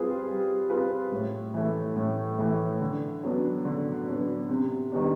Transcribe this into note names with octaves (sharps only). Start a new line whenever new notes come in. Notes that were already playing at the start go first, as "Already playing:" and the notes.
Already playing: G3 C4 F4 G#4 B4
G3
C4 F4 G#4 B4
A2
E3 A3
A2
E3 A3
D3
F#3 B3 D4
D3
F#3 B3 D4
C3
D#3 G3 B3 D4